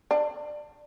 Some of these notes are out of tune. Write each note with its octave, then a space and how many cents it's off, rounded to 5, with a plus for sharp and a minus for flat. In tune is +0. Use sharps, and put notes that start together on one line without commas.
D4 +15